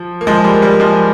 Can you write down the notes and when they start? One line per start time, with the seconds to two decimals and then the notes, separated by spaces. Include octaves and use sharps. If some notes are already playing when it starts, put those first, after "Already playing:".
Already playing: F3
0.21 A#3
0.27 F3 G#3
0.44 G3 A#3
0.62 G3 A#3
0.80 F3 G#3